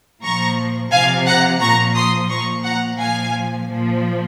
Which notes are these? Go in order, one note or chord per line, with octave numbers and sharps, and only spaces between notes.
A#2 F3 A#5 C#6
C3 F3 F5 G#5
F#5 A#5
A#2 F3 A#5 C#6
C6 D#6
A#2 F3 A#5 C#6
F#5 A#5
A#2 F3 F5 G#5
A#2 F3